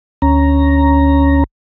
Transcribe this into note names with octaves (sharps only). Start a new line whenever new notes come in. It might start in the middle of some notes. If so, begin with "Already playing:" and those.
D2 C#4 A#5